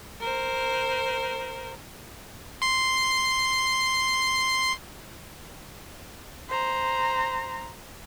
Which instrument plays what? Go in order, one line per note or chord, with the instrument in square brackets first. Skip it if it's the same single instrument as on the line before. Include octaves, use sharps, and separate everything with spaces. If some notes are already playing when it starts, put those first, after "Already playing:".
[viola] A#4 C5
[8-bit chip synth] C6 C7
[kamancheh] C5 A#5